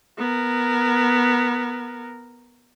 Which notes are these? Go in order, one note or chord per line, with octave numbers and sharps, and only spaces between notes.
B3 A#4